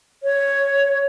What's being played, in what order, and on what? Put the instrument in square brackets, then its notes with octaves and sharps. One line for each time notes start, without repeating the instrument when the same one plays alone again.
[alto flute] C#5